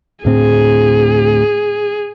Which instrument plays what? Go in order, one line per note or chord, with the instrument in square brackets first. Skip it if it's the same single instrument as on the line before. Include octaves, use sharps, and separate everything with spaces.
[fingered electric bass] D2 A2 C4 [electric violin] G#4